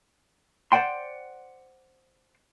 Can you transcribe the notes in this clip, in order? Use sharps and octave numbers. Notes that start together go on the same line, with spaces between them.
C5 D5 F#5 G5 C6